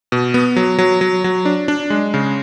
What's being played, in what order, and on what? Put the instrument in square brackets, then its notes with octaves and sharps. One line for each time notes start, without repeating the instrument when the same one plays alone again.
[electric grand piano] B2
B3
F#3
F#3
F#3
F#3
D4
D4
G#3
C#3